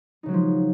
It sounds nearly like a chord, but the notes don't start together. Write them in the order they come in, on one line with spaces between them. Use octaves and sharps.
D#4 C#3 F#3 G#3 F3